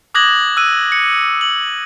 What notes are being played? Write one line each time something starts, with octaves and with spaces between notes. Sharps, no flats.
D6 D#6 F#6 G#6 A#6 F#7
E6 F#6 D#7
C#7
F#7